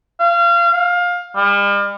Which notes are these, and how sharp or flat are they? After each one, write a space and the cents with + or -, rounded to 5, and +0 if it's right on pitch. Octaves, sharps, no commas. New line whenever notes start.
F5 -25
F5 +20
G3 +45